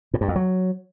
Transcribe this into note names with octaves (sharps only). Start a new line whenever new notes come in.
A2
G2
F2
F#3